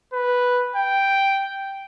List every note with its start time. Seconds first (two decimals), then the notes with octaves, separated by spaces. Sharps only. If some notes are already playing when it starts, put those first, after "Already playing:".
0.13 B4
0.76 G5